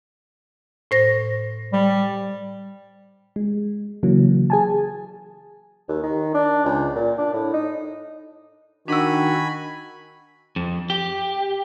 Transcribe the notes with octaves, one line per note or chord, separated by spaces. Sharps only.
A2 C5 A#6
G3
G#3
C#3 E3 F#3 A#3
G#4 G#5 A5
D#2
D#3
D4
C#2
A#2
D4
A2
D#4
D#3 D4 F#4 G#5 B5 E6
F2
G4